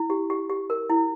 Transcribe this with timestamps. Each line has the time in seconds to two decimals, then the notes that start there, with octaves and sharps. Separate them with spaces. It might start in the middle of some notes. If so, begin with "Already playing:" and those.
Already playing: E4
0.10 G4
0.30 G4
0.50 G4
0.70 A#4
0.90 E4